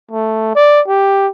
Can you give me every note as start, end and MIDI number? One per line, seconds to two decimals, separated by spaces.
0.11 0.55 57
0.55 0.81 74
0.88 1.28 67